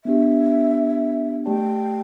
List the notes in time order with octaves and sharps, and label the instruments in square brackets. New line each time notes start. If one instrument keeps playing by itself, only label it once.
[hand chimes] B3 D4 G4 [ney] E5
[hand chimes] A3 G4 D5 A5 [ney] G5